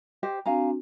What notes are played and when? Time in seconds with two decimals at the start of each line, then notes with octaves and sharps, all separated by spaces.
0.23 G4 C5 D#5
0.46 C4 D4 F#4 F5 G#5 A#5